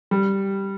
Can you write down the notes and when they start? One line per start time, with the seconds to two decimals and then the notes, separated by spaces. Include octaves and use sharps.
0.11 G3